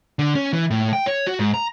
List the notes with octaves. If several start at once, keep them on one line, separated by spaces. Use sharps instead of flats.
D3
C#4
E3
A2
G5
C#5
F#4
G#2
A#5